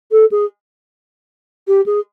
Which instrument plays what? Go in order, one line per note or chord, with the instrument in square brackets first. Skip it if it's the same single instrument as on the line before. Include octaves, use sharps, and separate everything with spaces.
[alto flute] A4
G#4
G4
G#4